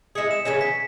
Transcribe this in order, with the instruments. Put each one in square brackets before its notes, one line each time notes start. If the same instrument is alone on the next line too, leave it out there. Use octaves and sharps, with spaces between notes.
[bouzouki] G#3 E4 G#4 [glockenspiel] C#7
[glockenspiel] E7
[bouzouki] C#3 E3 G#3 C#4 [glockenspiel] E7
[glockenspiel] B6